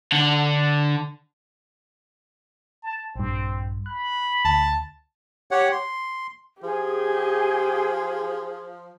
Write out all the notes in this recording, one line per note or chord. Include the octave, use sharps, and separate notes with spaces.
D3
A5
A#1 G2 C4
B5 F#6
D2 A5
G4 C#5 F#5
C6
F3 G4 G#4